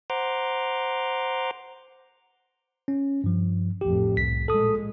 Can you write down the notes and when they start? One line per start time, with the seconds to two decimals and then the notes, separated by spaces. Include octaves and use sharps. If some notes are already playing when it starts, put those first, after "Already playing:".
0.10 C5 F#5 A#5 C6 D6
2.88 C#4
3.24 G2 F3
3.81 A1 F2 G4
4.17 C2 B6
4.48 A#2 G#3 A4 D#6